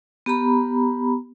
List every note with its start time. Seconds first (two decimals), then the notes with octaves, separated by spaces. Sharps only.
0.26 B3 G4 A#5 B5